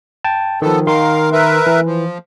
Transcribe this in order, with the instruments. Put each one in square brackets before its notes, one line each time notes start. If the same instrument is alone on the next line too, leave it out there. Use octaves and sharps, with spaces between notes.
[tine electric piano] G5 A5
[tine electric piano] D#3 F3 [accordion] B3 A4
[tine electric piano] D#3 C6 [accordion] A#4 F5
[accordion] A#4 B4 E5
[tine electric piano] E3
[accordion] F3